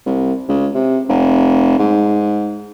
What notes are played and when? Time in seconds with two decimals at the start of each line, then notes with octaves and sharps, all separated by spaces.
0.06 C2
0.49 C#2
0.74 C3
1.09 F1
1.79 G#2